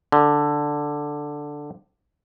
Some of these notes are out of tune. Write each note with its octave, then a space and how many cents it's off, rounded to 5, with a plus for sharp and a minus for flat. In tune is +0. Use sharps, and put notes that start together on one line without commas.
D3 +5